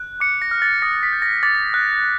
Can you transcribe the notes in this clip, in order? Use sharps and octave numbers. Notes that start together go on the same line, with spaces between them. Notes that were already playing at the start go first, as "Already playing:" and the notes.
Already playing: F#6
D6 C#7
A#6
F6
A6
D#6 A#6
B6
G6
A#6
D6 A6
F#6